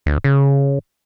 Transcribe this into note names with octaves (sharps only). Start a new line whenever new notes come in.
D2
C#3